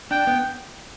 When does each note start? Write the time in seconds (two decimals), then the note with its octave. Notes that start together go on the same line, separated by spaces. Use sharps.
0.11 D4 G5
0.27 B3